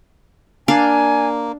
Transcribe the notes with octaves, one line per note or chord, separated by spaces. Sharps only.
A#3 D4 F5 G#5